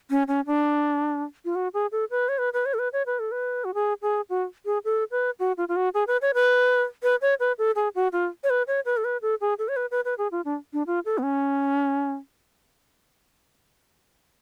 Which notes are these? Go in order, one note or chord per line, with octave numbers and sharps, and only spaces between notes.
C#4
C#4
D4
F4
F#4
G#4
A4
B4
C#5
B4
B4
C#5
A4
B4
C#5
B4
A4
B4
F#4
G#4
G#4
F#4
G#4
A4
B4
F#4
F4
F4
F#4
G#4
B4
C#5
B4
B4
C#5
B4
A4
G#4
F#4
F4
C#5
B4
C#5
B4
A4
B4
A4
G#4
A4
C#5
B4
B4
B4
G#4
F4
D4
D4
F4
A4
B3
C#4